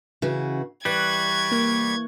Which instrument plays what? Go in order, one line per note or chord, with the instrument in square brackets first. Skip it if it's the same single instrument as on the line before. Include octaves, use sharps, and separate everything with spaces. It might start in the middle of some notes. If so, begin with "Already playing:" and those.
[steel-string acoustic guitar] C#3 E3 F#4
[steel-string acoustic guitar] E3 [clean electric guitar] G3 [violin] C#6 G#6 [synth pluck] F#6
[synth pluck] A#3